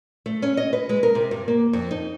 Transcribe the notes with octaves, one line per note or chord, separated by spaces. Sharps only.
A3
C#4
D#5
B4
G#3
A#4
C3
G2
A#3
F2
D#4